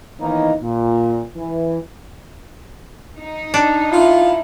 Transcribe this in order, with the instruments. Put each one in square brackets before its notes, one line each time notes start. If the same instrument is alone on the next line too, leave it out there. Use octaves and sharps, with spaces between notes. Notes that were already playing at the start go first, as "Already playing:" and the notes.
[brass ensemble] D#3 E3 A#3 B3 C#4 D#4
A#2
E3
[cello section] D#4
[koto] D4
[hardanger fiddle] E4 [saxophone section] F4